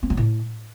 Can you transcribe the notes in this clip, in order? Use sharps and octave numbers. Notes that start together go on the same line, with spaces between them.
C4
F#3
A2